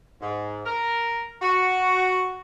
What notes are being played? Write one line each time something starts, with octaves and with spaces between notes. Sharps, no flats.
G#2
A#4
F#4